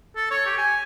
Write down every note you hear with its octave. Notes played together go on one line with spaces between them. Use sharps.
A4
C#5
G4
G#5